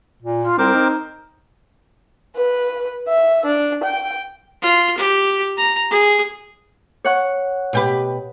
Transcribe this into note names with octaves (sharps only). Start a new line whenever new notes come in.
A#2
F4
C2 C4 A#4 C5 D6
D#4
B4
E5
D4
G5
F4
G4
A#5
G#4
C#5 F#5 C#6
B2 G4 B4